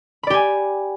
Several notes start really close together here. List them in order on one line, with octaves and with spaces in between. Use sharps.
B5 D5 G4 G#5